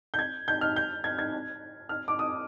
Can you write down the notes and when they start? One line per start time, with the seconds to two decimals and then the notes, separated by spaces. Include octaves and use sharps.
0.14 G6
0.19 G#6
0.48 G6
0.61 F6
0.76 G6
1.04 G#6
1.19 G#6
1.89 F6
2.08 D6
2.19 D#6